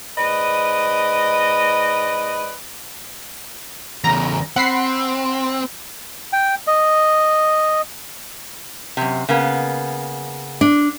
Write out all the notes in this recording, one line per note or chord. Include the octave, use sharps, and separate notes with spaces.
G#2 B4 D5 D#5
E2 C#3 A#5
C4 F#5 B5 C7
G5
D#5
F#2 C3
C#3 A#3 B3
D4